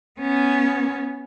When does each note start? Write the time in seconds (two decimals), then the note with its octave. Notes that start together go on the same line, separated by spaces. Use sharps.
0.20 B3 C#4